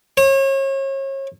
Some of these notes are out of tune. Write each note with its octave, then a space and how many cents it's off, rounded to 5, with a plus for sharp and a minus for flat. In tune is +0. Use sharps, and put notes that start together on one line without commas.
C#5 -35